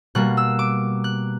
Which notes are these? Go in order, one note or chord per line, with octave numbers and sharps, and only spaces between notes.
B2 G3 A#3 F#6
E6
D6
F#6